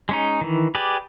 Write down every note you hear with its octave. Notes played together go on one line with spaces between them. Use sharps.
G#3 C#4 D#4
D#3 E3
G4 G#4 B4 D5